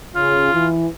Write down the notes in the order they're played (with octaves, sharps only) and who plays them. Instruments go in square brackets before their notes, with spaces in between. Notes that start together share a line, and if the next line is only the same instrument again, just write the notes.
[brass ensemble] C#3 [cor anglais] F4
[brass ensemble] E3